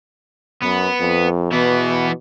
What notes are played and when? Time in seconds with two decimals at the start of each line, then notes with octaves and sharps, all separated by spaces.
0.63 F#2 B3
1.00 F2
1.52 B2 E3 B3